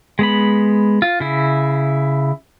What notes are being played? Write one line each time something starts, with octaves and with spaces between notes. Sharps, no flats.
G#3 B3 B5
F4
C#3 E4